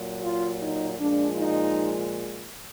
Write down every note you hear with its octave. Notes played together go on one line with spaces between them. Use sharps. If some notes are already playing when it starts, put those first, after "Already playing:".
Already playing: A#2 F#3
F4
D#4
A#2 F3 G#3 D4
D#4